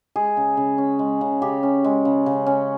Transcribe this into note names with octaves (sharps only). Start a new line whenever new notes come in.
G#3 G#4
C#3
C#3
C#4
G#3
C#3
C#3 G4
C#4
G#3
C#3
C#3
C#4